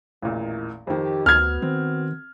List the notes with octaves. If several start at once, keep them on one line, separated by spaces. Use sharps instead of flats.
A1 E2 A#2 D#3 A#3 E4
F2 D#3 G4
D2 B3 F#4 F6 G#6
D#3 C4